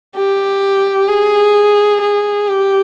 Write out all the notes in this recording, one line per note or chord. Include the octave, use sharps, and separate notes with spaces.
G4
G#4
G#4
G4